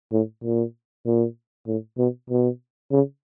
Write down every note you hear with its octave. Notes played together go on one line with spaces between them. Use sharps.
A2
A#2
A#2
A2
B2
B2
C#3